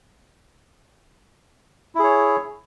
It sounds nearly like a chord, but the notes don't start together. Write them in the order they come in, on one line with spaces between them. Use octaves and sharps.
E4 G#4 C#5